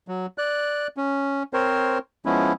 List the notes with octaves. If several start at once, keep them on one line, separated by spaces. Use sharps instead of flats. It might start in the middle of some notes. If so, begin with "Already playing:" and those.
F#3
D5 F#6
C#4
C4 A#4 C5 C#5
F3 G#3 B3 C#4 E4